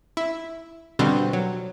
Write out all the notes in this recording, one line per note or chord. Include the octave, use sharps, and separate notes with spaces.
E4
B2 D3 G3 C4
F#3